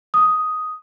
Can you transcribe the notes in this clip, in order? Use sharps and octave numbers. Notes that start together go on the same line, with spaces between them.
D#6